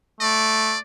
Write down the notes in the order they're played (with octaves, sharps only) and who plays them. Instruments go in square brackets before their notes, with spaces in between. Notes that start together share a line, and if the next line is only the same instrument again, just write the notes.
[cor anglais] A3 [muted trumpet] D5